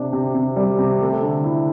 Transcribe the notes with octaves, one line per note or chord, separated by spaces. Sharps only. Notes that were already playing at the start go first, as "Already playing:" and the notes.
Already playing: C3 D4
C3
C3
G3
C3
A3
D3
E4